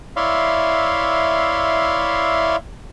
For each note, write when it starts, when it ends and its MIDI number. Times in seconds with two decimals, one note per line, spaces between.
0.16 2.56 64
0.16 2.56 73
0.16 2.56 74
0.16 2.56 76
0.16 2.56 77
0.16 2.56 84